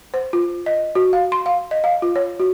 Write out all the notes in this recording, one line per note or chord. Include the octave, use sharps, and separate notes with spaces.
C5
F4
D#5
F#4
F5
C6
F5
D#5
F5
F4
C#5
F#4